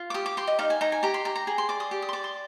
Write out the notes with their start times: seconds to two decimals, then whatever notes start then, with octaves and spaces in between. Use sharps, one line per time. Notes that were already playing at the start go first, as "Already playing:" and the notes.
Already playing: F4
0.10 D6
0.14 G4 D#6
0.26 D6
0.37 G4 C6
0.47 D#5
0.59 D#4 F5
0.70 G#5
0.81 D#4 A#5
0.92 G#5
1.03 G4 A#5
1.14 C6
1.25 G4 A#5
1.36 A#5
1.47 G#4 A#5
1.58 C6
1.69 D5 D6
1.80 D#6
1.91 G4 D6
2.02 D#6
2.09 C6
2.13 D5 D6
2.24 C6